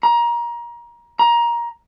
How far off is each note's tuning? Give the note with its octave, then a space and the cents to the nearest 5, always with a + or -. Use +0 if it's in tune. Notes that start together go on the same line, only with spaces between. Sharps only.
A#5 +25
A#5 +20